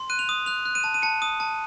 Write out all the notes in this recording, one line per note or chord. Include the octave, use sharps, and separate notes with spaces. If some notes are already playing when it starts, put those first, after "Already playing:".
Already playing: C6
F#6 D#7
F7
D#6
F#6 F7
F#6
D#7
A5
D#7
A5 C#7
D#6
A5